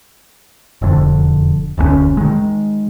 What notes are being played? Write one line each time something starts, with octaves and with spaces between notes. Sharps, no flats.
E1 F2 D3
E1 D2 G3 C#4
D#3 G#3